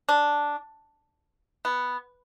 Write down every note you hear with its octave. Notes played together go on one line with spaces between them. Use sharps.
D4
B3